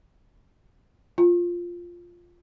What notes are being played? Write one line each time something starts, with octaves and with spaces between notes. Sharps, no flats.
F4